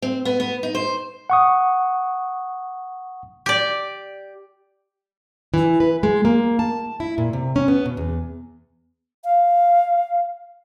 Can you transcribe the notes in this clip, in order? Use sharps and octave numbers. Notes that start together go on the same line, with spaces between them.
C4
B3
B3
D#4
C5
F#5 C#6 D#6
G4 D5
E3
B4
G#3
A#3
A5
E4
A#2
C3
C#4
B3
B2
E2
F5